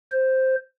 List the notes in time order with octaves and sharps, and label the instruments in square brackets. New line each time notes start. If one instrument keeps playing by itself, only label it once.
[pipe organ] C5